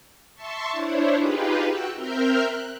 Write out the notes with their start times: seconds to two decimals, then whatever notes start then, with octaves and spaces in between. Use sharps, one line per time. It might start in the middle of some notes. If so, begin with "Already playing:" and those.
0.35 E5 A5 C6 C#6
0.71 D4 E4 C5 C#5
1.17 D#4 F4 G4 G#4 B4
1.66 F#4 G5 E6 F#6
1.95 C4 A#4 E5 F6 G6
2.43 F#6